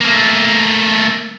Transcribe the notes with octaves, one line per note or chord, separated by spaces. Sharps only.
A3 A#3